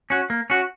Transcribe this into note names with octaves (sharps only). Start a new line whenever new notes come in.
C#4 F#4
A#3
C#4 F#4